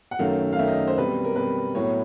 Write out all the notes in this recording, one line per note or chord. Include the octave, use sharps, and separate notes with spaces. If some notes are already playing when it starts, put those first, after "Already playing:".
F#5
F#2 D#3 F#3 A3 F5
F5
F#2 D#3 F#3 A3 E5
D#5
C5
B2 G3 C4 B4
A#4
B2 G3 C4 B4
A2 F#3 B3 C#5